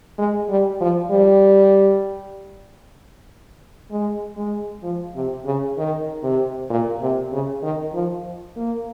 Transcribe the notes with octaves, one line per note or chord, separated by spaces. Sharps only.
G#3
G3
F3
G3
G#3
G#3
F3
C3
C#3
D#3
C3
A#2
C3
C#3
D#3
F3
A#3